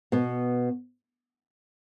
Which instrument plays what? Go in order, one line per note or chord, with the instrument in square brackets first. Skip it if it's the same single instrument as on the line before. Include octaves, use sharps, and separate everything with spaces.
[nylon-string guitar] B2 B3